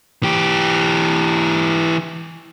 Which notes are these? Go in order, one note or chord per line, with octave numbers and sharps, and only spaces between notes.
E3 G4